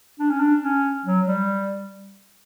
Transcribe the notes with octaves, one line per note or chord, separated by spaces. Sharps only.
D4
C#4
D4
C#4
F#3
G3